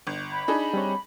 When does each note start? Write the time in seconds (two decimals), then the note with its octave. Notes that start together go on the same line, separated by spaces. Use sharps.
0.07 G1
0.32 B5
0.48 D4 D#4 G#4
0.74 G3 C4 C#5